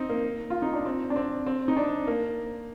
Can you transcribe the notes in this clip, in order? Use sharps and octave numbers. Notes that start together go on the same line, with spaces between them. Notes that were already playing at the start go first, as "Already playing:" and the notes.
Already playing: C4 D#4
A#3
F4
D#4
D4
C4
D4
C4
C4
D#4
D4
A#3